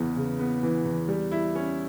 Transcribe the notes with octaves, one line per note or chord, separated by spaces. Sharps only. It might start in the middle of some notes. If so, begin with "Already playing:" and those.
Already playing: E2 C#3 E3 B3
C#3
B3
E3
E2
G3
E4
C#4